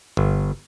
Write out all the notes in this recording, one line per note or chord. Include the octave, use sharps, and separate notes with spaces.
G1